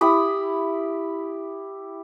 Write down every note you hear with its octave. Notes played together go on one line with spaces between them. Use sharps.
E4 G4 B5 D#6